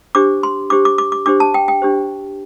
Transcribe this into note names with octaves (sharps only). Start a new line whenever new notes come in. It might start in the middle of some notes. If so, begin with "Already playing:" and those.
D4 G4 C5 D6
C6
D4 G4 C5 D6
D6
D6
D6
D4 G4 C5 D6
A5
G5
G5
D4 G4 C5